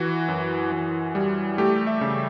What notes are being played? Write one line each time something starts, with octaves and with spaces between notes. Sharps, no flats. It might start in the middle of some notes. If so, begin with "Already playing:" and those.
Already playing: E3 F#4
F#2
E3
G3
A3 G4
E5
C#3